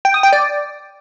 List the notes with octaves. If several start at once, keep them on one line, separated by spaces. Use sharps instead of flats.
G5
D#6
G5
D5